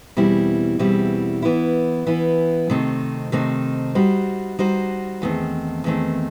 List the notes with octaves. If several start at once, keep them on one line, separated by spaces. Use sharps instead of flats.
E2 B2 G3 C4 E4
E2 B2 G3 C4 E4
E3 B3 E4
E3 B3 E4
C3 D#3 A3 C4 D#4
C3 D#3 A3 C4 D#4
G3 D#4 F#4 C5
G3 D#4 F#4 C5
E2 D#3 A3 C4
E2 D#3 A3 C4